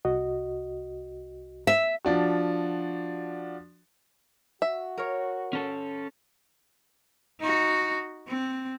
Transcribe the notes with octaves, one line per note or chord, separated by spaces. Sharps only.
C2 F#4 D#5
E5
F3 D4 F#4
F#4 E5
A#4 C#5
C#4 A4
D#4 F#4
C4